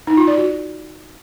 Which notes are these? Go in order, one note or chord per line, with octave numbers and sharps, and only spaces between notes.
D#4
F4
D5
F#4